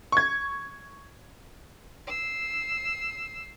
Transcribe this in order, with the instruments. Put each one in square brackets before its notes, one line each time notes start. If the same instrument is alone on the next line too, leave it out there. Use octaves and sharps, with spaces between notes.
[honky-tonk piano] C#6 G#6
[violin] E6 C7